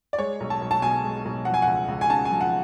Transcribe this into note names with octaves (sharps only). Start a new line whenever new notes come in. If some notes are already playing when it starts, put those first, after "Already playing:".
D5
G#3 C#5
B1
A5
B1
A5
B2 G#5
G#3
B1
F3 F#5
G#5
C#2 F#5
C#2
G#5
C#3 A5
G#5
F3
F#5